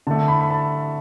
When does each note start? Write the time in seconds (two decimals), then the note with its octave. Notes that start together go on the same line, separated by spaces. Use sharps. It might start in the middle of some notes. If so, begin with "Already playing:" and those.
0.07 D3 A3 A5
0.28 B5
0.41 B5
0.50 A5